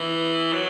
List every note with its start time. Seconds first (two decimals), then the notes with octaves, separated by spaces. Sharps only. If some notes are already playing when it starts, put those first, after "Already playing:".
Already playing: E3
0.53 F#3